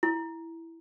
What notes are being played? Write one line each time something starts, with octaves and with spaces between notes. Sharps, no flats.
E4